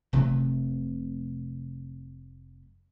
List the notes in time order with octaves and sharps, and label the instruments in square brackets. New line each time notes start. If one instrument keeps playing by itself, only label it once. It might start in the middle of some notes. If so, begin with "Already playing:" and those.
[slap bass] F1 C3 F#3 A3